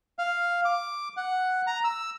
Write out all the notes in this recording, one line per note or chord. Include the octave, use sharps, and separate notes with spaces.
F5
D6
F#5
A#5
E6